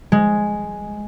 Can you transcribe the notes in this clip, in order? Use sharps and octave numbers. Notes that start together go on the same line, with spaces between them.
G#3